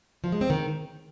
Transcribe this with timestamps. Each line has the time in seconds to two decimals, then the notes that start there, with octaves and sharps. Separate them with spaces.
0.24 F3
0.32 G#3
0.41 C4
0.50 D#3